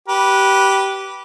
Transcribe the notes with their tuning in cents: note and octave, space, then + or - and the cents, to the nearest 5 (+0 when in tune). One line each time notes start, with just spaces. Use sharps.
G4 -15 B4 -15